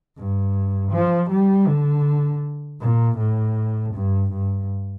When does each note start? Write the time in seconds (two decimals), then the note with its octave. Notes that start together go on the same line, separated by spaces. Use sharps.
0.17 G2
0.92 F3
1.30 G3
1.67 D3
2.81 A#2
3.18 A2
3.94 G2
4.32 G2